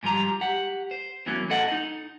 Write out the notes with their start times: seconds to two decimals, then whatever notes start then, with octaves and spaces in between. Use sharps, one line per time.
0.03 G#2 F3 G3 A#5
0.41 G4 F#5
0.91 C5
1.26 E2 E3 F#3 A#3 C#4
1.50 A2 A4 D#5 F#5
1.72 D#4